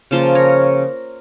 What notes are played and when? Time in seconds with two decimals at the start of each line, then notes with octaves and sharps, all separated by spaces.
0.11 C#3 F3 A#3 A5 C6
0.35 A#4 C#5